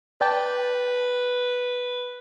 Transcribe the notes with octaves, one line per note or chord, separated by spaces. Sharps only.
B4 D5 G5 A5